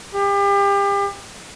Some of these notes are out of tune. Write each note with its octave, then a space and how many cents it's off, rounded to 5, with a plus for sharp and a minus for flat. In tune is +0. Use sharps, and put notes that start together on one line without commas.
G4 +35